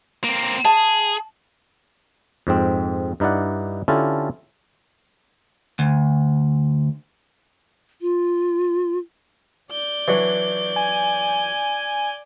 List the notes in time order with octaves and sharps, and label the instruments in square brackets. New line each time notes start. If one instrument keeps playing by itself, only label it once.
[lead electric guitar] A#3 C4
[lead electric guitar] G#4 [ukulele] A5
[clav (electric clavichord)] F2 G#2 C4
G2 D#4 E4 D5 F#5
D3 C#4 E4 F4 G4 A4
[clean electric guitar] D2
[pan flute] F4
[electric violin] D5 G6
[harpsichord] E3 F#3 D4
[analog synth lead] G#5